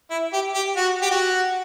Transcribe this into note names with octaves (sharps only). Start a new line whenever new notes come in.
E4
G4
G4
F#4
G4
F#4